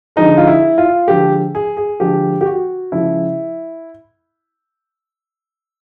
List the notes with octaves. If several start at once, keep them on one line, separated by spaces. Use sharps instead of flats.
D3 F3 G#3 D#4
F4
E4
F4
D3 F3 G#3 G4
G#4
G#4
D3 F3 G#3 G4
G4
F#4
C#3 F3 G#3 E4